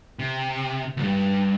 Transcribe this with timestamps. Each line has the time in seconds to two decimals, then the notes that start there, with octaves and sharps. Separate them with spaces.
0.19 C3
0.97 D2 G2